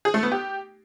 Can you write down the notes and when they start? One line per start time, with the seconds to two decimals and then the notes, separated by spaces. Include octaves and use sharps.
0.05 G#4
0.14 A3
0.23 B3
0.32 G4